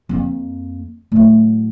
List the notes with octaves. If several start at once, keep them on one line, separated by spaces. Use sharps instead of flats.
F2 A#3
A2 F#3